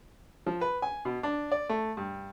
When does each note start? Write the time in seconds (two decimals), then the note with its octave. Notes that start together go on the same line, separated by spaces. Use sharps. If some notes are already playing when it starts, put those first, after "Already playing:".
0.46 F3
0.61 B4
0.82 G#5
1.05 B2
1.23 D4
1.52 D5
1.69 A3
1.97 G2